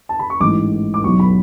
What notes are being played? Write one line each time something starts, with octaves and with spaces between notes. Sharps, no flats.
A5
B5
C#6
A1 G#2 E3 D6
D6
B1 B2 F#3 C#6
B5